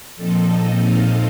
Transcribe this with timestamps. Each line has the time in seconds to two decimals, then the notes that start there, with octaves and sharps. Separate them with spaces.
0.16 A#2 F3 C4 D#4 A4
0.47 D#5
0.77 F5